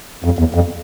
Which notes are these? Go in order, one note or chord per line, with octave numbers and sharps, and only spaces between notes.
F2
E2
F2